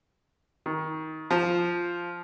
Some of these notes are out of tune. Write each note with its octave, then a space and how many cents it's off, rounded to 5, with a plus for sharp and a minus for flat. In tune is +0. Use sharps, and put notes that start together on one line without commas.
D#3 +20
F3 -5